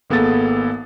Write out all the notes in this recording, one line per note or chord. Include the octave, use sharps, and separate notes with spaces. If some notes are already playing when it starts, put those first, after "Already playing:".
G#1 A#3 B3 G#4 A4 A6